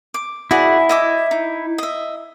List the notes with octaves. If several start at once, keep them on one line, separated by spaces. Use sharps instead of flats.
D6
E4 F#4 G#4 D5
D#5 E5 D6
D#4
D#5 E5